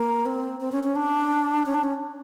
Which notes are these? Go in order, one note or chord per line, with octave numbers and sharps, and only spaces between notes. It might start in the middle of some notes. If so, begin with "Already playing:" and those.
Already playing: A#3
C4
C4
C#4
C#4
D4
C#4
D4
C#4